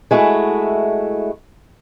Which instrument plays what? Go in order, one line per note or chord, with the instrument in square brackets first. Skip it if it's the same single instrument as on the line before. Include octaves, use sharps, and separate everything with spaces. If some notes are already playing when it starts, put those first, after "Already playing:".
[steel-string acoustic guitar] G#3 A3 E4 F#4